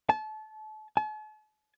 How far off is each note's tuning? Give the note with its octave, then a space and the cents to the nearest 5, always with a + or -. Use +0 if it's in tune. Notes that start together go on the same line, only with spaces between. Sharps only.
A5 -30
A5 -45